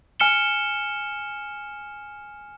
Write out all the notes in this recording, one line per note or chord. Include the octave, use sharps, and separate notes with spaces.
G#5 F6 C#7 E7 G7